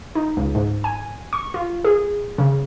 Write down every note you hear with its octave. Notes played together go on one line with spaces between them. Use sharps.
D#4
C#2
G#2
G#5
C#6
F4
G#4
C#3